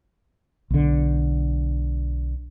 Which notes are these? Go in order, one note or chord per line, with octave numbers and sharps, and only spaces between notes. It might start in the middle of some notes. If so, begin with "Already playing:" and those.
B1 D3